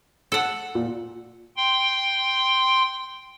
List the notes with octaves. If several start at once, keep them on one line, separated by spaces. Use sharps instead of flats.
A4 F#5
A#2
G5 C6